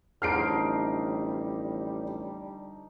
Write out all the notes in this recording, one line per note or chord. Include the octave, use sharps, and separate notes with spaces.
A1 D3 F3 G3 D#4 F6 C7 D7